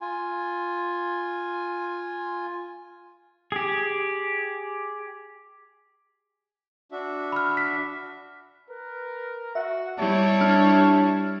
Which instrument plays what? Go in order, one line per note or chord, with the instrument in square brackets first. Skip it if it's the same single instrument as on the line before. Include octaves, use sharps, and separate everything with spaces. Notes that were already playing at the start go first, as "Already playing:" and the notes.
[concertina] F4 G#5
[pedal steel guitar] G4 G#4
[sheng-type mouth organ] D4 F#4 E5
[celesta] B5 F6
B6
[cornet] A#4 [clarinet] B4
[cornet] F#4 [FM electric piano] E5 [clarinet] F#5
[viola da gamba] G3 E4 [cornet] C#5 [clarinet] A5
[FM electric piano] D4 F6